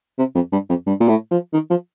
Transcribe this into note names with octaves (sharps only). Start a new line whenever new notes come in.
C3
F2
G2
F2
G2
A#2
A2
F3
D#3
F3